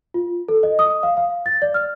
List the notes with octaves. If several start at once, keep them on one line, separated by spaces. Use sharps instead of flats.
F4
A4
D#5
D#6
F5
F5
A6
D5
F6